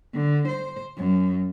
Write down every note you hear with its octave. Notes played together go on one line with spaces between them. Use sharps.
D3
C5
F#2